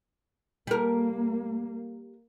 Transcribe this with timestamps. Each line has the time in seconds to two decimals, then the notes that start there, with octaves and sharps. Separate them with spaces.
0.67 G3 A#3 A#4